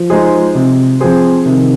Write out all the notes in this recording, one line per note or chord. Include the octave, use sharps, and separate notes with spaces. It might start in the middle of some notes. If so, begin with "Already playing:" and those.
Already playing: F3
G#3 D#4 G#4 C5
C3
F3 C4 G#4 C5
C3 D#3